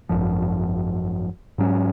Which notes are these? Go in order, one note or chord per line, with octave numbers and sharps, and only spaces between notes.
G#1 F#2 F3
G#2 F#3 C#4